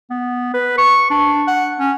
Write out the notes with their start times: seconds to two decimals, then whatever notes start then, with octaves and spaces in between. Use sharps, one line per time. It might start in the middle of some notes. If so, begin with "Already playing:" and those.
0.10 B3
0.54 B4
0.78 C#6
1.10 D4
1.47 F#5
1.80 C#4